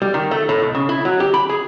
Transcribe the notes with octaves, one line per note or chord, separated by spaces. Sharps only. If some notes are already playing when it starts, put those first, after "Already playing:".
G3
D#3
A3
A2
B1
C#3
E4
F#3
G4
B5
G#4